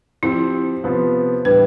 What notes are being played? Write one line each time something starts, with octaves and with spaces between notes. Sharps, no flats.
F3 C4 E4 G4
C3 F3 B3 F4
A2 E3 G3 D4 G4 B4